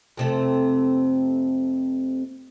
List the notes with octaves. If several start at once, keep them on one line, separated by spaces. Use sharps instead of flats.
F2 C3 A3